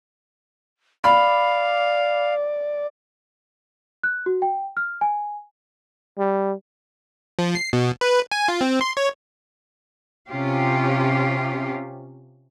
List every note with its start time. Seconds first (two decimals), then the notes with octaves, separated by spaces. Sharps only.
1.04 D5 F5 B5
4.03 F#6
4.26 F#4
4.42 G5
4.77 F6
5.01 G#5
6.17 G3
7.39 F3
7.55 C7
7.73 B2
8.01 B4
8.32 G#5
8.48 F4
8.61 C4
8.81 C6
8.97 C#5
10.29 C3 C#4 F4 G4